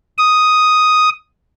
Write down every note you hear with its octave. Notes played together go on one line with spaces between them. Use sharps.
D#6